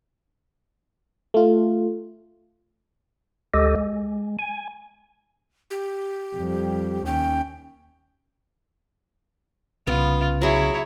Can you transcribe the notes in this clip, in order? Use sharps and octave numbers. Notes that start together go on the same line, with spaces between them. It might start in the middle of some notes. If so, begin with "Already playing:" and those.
A3 F4
D2 G#3 G4 A4 D#5
G#3
G#5
G4
F2 G3
D#2 C#4 G5
C2 C#3 B3 F4
F#3 E4 G#4 C#5